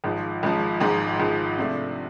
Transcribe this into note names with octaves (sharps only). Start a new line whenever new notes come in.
G#1 G#2 F3
G#1 G#2 F3
G#1 G#2 F3
G#1 G#2 F3
C3 F3 A3 D4